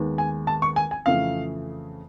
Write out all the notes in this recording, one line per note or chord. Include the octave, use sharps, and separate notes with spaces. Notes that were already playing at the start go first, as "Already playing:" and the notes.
Already playing: D#2 D#3 G#3 B3
G#5
A5
C#6
G#5
G#5
F2 C#3 E3 A3 F5